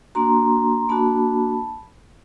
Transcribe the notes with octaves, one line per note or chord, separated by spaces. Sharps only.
A#3 D4 F#4 A#5 C6
A#3 D4 F#4 A5 B5